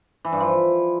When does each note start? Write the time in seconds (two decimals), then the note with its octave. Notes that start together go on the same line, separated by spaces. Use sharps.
0.25 E3
0.32 G2
0.40 F3